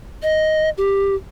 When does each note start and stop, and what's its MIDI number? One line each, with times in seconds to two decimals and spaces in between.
0.23 0.70 75
0.78 1.15 67